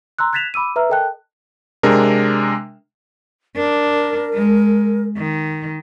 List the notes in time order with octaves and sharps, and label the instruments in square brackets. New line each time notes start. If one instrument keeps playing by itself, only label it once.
[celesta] A#5 C6 E6 F#6
F#6 G#6 A6 B6 E7 F7
B5 D6 E6 D#7
B4 E5 A#5 E6 F6
A4 A#4 D#5 G5 A5 F#6
[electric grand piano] C3 G#3 D4 A#4
[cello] D4 [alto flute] A#4
[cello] G#3
D#3